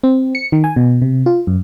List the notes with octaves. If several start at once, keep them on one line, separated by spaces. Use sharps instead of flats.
C4
C#7
D#3
G#5
B2
C3
F4
F#2